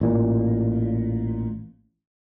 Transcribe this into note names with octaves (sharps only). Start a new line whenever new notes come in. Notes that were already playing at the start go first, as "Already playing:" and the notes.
A1 A#2